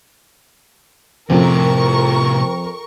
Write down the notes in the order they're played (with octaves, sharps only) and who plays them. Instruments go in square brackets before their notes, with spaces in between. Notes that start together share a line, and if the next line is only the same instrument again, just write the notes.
[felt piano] F2 [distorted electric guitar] A2 C3 [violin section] A#4 C#6